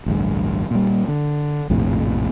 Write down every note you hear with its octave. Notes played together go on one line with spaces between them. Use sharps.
A1 D2 G2
A#2 G3
D3
A#1 F2 A2 C3